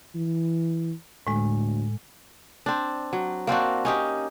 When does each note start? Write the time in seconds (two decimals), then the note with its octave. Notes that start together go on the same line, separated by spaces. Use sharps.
0.15 E3
1.27 D2 A2 G#3
2.66 C4 D4
3.13 F#3
3.47 A#3 C4 D4 F#4
3.85 C#4 D#4 G4